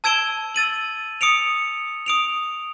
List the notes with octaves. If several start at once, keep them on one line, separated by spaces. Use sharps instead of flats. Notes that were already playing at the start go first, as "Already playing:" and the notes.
A5 E6 G#6 D7 E7 G7
E6 A6 D#7 F#7
D#6 C#7 D7 F7
D#6 D7 F7